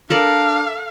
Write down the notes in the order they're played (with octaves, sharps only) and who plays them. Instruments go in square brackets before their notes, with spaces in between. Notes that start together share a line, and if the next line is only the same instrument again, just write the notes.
[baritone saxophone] D4 [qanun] A4 A#4 D5 [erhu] F5